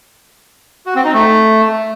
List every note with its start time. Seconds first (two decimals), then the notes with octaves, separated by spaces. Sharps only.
0.86 F#4
0.95 C4
1.04 D#4
1.14 A3